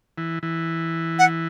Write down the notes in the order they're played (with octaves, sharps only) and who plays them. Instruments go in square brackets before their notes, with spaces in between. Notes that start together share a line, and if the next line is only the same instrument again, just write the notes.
[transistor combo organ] E3
E3
[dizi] F#5